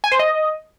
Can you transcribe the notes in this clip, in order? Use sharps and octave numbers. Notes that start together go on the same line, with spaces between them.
G#5
C5
D#5